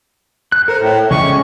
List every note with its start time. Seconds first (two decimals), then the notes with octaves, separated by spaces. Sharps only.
0.52 F#6
0.68 A4 A#4 C5
0.81 A2
1.11 C#3 F3 G#3 C#4 D5 C#6